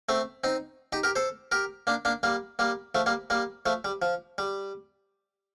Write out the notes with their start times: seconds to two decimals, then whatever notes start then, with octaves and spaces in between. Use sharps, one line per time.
0.09 A3 C4
0.44 C4 D#4
0.92 D#4 G4
1.03 G4 A#4
1.16 A4 C5
1.52 G4 A#4
1.87 A#3 D4
2.05 A#3 D4
2.23 G3 A#3
2.59 G3 A#3
2.95 F3 A3
3.06 G3 A#3
3.30 G3 A#3
3.66 F3 A3
3.85 G3
4.02 F3
4.38 G3